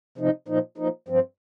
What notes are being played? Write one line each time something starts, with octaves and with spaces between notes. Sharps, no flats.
C3 F3 D#4
A#2 F3 D#4
A#2 F3 D#4
G2 F3 C4